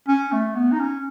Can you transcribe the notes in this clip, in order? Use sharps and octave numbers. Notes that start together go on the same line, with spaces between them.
C#4
A3
B3
D#4
C#4